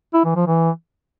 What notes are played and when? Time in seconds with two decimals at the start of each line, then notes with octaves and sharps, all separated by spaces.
0.14 E4
0.25 E3
0.36 F3
0.47 E3